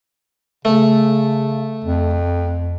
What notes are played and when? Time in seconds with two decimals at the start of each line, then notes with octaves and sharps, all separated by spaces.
0.65 C#3 A3
1.84 F2